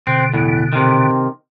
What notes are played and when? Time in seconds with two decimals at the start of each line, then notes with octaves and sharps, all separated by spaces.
0.07 B2 D3 C4
0.34 E2 A2
0.73 C3 D#3